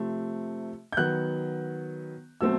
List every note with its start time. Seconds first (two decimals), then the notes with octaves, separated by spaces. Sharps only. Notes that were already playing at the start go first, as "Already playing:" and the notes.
Already playing: C3 F3 A3 C4
0.92 G6
0.97 D#3 F#3 B3 F#6
2.41 B2 F#3 A3 C4 E6